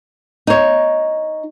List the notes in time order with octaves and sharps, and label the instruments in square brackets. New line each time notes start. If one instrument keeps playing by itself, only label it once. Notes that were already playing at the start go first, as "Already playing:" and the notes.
[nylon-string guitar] D#4 C#5